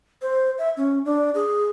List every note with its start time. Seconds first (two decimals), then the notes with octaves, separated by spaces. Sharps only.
0.22 C5
0.58 E5
0.77 C#4
1.05 D4
1.35 G#4